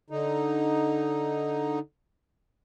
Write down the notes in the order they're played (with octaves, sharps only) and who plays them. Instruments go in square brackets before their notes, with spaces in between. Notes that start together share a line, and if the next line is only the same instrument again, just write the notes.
[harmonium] D3 D#4